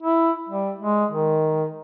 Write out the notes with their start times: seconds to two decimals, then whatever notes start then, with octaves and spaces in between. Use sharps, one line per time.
0.03 E4
0.49 G3
0.79 G#3
1.11 D#3